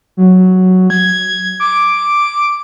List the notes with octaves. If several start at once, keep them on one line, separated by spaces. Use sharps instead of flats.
F#3
G#6
D6